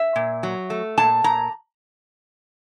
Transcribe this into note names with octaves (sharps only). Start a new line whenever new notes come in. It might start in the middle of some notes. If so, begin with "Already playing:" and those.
Already playing: E5
A#2
F#3
A3
A#2 A5
A#2 A#5